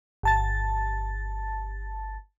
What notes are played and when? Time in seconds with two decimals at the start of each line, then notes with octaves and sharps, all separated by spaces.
0.23 G1 A5 A6